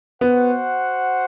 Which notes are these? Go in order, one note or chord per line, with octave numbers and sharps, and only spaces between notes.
B3 F#4 C5 F#5